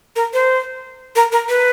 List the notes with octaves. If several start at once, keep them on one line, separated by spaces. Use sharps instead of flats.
A#4
C5
A#4
A#4
B4